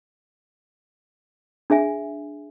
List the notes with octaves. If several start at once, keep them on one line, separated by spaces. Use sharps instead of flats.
D4 G#4 E5 G#5